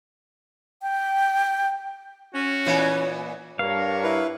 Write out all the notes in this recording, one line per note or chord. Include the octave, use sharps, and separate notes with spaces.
G5
C#4 F#4
A#2 E3 B3 C#5
G2 D4 A#4 C#5 F5
E4 B4